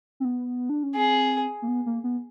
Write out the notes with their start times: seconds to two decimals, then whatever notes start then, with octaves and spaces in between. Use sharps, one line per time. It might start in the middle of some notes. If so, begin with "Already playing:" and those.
0.20 C4
0.25 B3
0.69 D4
0.83 C#4
0.96 C4 G#4
1.62 A#3
1.68 B3
1.86 A#3
2.04 B3